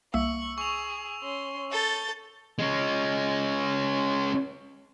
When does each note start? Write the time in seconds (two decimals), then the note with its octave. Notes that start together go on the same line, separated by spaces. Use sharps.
0.14 C2 A#3 E5 C#6 E6
0.58 G#4 C#6 F7
1.22 C#4 C6
1.71 A4 G6 A6
2.59 G#3 C#4